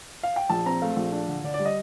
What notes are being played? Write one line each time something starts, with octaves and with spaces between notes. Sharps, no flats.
F5
G5
A#1 A5
C4 A#5
A3 F5
A#1
D4
D3
D3 D5
D5
G3
D#5